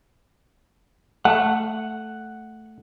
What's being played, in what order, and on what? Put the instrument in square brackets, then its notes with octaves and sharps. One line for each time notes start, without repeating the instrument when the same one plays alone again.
[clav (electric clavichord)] A3 [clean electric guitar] F#5